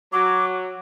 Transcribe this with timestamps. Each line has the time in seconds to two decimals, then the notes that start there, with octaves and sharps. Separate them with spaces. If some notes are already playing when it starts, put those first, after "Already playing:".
0.13 F#3 D6